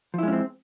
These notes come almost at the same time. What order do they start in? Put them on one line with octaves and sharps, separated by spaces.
F3 E4 G#3 C#4 C4